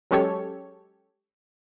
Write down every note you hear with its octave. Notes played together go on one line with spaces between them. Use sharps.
F#3 G#3 C#4 G4 A4 C#5